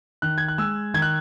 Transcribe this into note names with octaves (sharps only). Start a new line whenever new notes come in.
D#3 F#6
G#6
F#6
G#3 E6
D#3 G#6
F#6